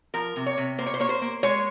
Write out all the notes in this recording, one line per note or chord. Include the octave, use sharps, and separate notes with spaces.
F3 A#4
C3
C#5
C3
A#3 C5
C#5
C5
A#3 C#5
C5
A#3
G#3 C#5